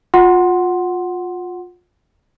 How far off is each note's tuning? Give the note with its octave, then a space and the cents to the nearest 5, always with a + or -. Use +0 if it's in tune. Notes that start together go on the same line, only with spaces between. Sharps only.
F4 +25 F#5 +0 C6 +5